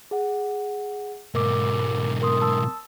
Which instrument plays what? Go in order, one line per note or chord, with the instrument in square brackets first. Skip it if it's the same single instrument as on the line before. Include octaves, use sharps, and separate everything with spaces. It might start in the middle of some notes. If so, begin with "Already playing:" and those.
[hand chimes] G#4 F#5
[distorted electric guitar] G#2 B2 [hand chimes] A#4 D6
[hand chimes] A#4 C6 D#6
A5 E6